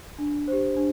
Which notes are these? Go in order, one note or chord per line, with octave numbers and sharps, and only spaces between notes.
D4
G4 C5
D4